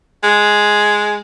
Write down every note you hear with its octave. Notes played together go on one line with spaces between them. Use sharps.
G#3